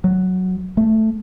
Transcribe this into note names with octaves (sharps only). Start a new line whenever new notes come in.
F#3
A3